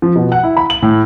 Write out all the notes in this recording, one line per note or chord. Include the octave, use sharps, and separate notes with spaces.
F3
B2
F#5
E4
B5
F#7
A2